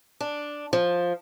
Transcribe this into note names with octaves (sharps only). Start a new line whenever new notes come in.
D4
F3